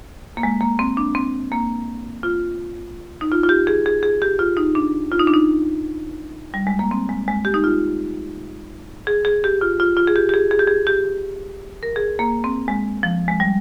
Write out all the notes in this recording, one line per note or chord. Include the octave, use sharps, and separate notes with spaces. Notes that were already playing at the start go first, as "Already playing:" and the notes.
A#3
G#3
A#3
C4
D4
C4
A#3
F4
D#4
F4
F4
G4
G#4
G#4
G#4
G4
F4
D#4
D4
F4
D#4
D4
D#4
G3
G#3
A#3
C4
G#3
G#3
G4
D#4
F4
G#4
G#4
G4
F4
F4
F4
G#4
G4
G4
G#4
G#4
G4
G#4
G4
A#4
G#4
A#3
C4
G#3
F3
G#3
G3